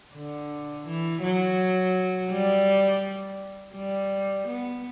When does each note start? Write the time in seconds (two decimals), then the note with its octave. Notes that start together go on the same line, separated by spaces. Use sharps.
0.15 D3
0.87 E3
1.23 F#3
2.32 G3
3.76 G3
4.48 B3